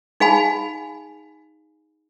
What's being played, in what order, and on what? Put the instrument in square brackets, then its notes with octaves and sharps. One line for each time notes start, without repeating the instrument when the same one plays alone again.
[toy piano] D#4 G#4 F5 G#5 B5